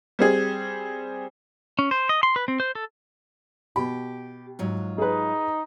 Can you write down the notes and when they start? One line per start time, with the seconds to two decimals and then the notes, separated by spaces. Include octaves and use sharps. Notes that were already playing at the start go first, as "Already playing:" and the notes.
0.19 G3 C4 G#4
1.79 C#4
1.91 C5
2.09 D#5
2.23 C6
2.36 B4
2.48 C4
2.60 C5
2.75 A4
3.76 B2 G4 B5
4.59 G#2 F#3 F4
4.98 D#4 G#4 B4